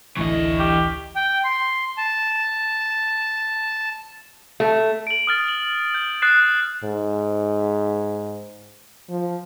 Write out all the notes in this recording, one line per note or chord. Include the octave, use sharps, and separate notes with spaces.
A1 D2 E3 A3 D4 E4 D#5 C#6
G4
G5
C6
A5
A3
D7 F#7
D#6 F6 A6
F#7
G6
D#6 F#6 A6 C7 E7
G#2
F3